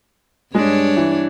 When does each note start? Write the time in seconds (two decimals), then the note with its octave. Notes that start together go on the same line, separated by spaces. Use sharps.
0.55 G2 G#3 D4 C#5
0.97 E3